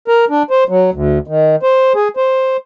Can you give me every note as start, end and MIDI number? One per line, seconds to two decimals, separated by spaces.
0.08 0.25 70
0.30 0.43 62
0.50 0.64 72
0.69 0.90 54
0.94 1.18 38
1.27 1.56 51
1.63 1.93 72
1.95 2.08 68
2.17 2.57 72